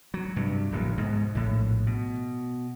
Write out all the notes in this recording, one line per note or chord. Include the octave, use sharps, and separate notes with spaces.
F#3
G2 C3
D1 A#1 D#2
G#2 B2 G#3
A#1 A2
B2